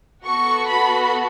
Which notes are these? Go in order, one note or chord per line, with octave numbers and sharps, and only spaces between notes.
B3 F#4 A4 C#6
B5